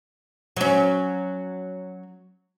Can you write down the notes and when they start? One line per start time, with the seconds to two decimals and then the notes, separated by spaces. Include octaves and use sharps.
0.57 F#3 C#4